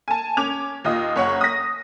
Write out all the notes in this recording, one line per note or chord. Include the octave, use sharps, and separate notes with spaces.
G#5 A5
C#4 D6 G#6 F7
D#2 F4 D#5 D#6
F#1 C#5 F#5
D#6 A#6